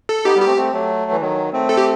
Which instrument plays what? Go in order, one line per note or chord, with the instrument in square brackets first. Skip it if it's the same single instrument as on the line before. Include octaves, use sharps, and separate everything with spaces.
[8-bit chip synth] A4
[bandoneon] B3 D#4 [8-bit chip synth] G4
[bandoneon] G3 B3
[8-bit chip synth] G4
[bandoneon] A3 C4
A3 C4
F#3 A3
E3
D#3 F#3
A3 C4
[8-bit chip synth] A4
G4